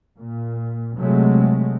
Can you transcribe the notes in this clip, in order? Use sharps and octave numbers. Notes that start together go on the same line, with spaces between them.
A#2
C3 F#3 G#3 A3